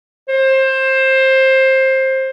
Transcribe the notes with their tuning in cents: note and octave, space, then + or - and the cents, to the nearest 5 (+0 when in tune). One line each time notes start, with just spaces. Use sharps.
C5 +20